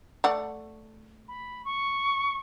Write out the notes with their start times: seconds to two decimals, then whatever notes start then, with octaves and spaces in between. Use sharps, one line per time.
0.24 A3 D5 F#5
1.27 B5
1.64 C#6